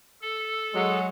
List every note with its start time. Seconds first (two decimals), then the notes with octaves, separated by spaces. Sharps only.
0.21 A4
0.74 F#3 G#3